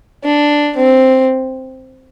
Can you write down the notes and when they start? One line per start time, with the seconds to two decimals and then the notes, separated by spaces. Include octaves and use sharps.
0.24 D4
0.77 C4